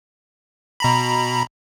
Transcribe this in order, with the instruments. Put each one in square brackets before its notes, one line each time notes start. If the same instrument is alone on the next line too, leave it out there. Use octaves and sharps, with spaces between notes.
[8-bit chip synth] B2 A#5 B5